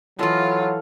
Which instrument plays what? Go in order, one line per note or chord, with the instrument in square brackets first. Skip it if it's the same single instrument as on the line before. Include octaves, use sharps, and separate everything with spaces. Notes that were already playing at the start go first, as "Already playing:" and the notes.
[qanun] E3 D#5 [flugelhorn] F#3 [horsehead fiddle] F4 [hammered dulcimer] A4 F5